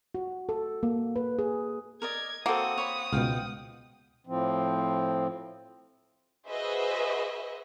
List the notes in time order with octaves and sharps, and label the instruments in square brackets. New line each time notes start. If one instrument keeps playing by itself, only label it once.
[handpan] F#4
A4
A#3
B4
G#4
[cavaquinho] A#4 D5 D#5 [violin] G#6
[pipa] A#3 C4 [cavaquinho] F#4 A4 [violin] F#5 D#6
[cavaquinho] C#5 B5
[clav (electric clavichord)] C#2 B2 [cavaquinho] F5 G5
[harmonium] A2 F3 C4
[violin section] F#4 G#4 B4 C5 D#5 E5